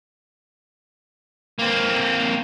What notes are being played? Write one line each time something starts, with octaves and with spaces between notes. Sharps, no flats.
A#3 C4